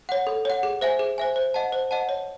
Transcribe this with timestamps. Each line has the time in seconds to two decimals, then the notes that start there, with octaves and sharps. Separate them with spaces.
0.09 C#5 F#5
0.27 A4
0.45 C#5 F#5
0.63 G#4
0.81 C5 E5 G#5
0.99 G#4
1.18 C5 E5 G#5
1.36 C5
1.54 D#5 F#5 A5
1.72 C5
1.91 D#5 F#5 A5
2.09 C#5